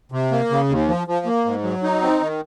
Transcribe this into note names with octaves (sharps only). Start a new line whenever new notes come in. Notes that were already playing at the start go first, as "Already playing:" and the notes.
C3
A#3
C#3
D#2
F3
F3
A#3
G#2
F#3
D#4
C4
D#3